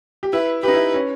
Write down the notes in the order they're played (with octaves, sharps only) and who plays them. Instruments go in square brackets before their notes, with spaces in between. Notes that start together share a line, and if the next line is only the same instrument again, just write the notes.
[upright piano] G4
[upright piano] E4 [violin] B4
[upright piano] G4 [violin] B4
[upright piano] D#4
E4
C#4